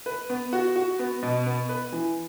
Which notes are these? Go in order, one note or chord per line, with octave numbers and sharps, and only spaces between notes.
B4
B3
F#4
F#4
B3
B2
B3
B4
E3